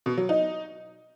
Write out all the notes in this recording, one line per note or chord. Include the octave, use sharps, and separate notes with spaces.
B2
F#3
D#4